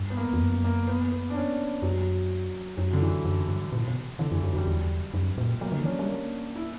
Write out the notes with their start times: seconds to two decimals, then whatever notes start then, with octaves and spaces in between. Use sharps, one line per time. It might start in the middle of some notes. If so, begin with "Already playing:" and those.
Already playing: G2
0.10 B3
0.17 A#3
0.33 E2
0.40 F#2
0.64 A#3
0.87 B3
1.12 B3
1.30 D4
1.35 C#4
1.82 F#2 F#3
2.77 F#2 F#3
2.93 D3
3.01 E3
3.25 F#2
3.48 G2
3.72 A#2
3.88 B2
4.19 D3 E3
4.32 F#2 E3
4.43 F#2 F#3
4.55 F#2 G3
4.67 E2
5.14 F#2
5.31 G2
5.38 A#2
5.61 F#3 A#3
5.72 D3
5.81 E3 C#4 D4
5.90 F#3
5.99 G3
6.08 A#3
6.56 E4